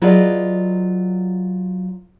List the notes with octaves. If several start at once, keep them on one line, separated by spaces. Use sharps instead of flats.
F#3 F4 G#4 B4 D5 D#5